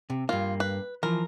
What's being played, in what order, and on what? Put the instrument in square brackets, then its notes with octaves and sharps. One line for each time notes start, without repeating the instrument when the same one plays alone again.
[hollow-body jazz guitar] C3
[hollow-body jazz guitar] G2 A#3 [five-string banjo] F4
[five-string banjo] B4
[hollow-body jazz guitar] E3 F3 [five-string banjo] A#4